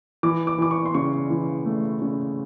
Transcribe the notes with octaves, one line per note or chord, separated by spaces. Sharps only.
E3 D6
D6
E3 D6
C#6
C6
C#3 C#6
E3
A3
C#3